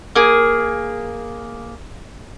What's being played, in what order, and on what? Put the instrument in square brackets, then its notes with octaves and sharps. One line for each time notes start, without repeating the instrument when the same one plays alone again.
[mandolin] A#3 G#4